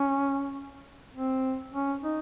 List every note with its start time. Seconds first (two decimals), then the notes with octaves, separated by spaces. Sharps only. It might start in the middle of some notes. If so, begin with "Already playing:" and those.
Already playing: C#4
1.14 C4
1.73 C#4
2.03 D#4